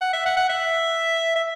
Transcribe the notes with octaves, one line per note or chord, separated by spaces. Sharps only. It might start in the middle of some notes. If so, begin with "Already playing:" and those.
F#5
E5
F#5
F#5
E5
E5